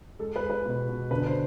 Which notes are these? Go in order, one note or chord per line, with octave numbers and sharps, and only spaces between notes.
G#3 A4
B4
G#3
B4
B2
B2
D3 B4
C5